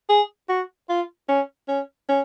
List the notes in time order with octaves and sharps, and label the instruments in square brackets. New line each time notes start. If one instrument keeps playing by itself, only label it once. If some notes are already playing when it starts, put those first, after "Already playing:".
[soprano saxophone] G#4
F#4
F4
C#4
C#4
C#4